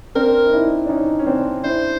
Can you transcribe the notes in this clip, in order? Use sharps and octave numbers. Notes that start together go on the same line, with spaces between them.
C4 D4 A#4
D#4
D4 E4
D4
C#4 D#4
C#4
C4 D4
D4 E4 C5